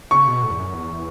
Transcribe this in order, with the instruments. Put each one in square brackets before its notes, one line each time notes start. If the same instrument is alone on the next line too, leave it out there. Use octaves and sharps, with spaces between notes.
[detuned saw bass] C#3 [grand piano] C#6
[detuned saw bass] B2
A2
E2
F#2
E2